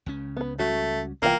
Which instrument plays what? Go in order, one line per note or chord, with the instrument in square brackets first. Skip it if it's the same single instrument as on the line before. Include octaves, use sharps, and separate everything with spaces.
[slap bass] C#2 C#3 C#4
[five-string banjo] B3 B4
[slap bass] C#2 G3 C#4 [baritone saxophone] A3 [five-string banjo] F#4
[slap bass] C2 B3 [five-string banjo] E3 F4 G5 [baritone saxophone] A#3